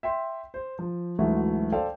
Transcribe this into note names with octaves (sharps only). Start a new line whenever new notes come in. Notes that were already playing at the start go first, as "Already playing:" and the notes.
E5 G5 C6
C5
F3
D2 G#2 E3 F#3 A3
A4 C5 D5 F5 G5